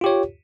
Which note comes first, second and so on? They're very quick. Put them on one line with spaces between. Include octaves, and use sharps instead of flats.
F4 G4 C#5